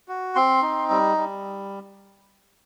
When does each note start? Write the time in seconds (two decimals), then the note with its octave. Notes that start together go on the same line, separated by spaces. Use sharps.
0.08 F#4
0.36 C4 C6
0.62 D#4
0.90 G3
1.17 G3